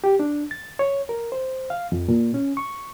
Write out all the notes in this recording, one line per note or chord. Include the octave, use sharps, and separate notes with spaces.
G4
D4
A6
C#5
A#4
C5
F5
F2
A#2
C#4
C#6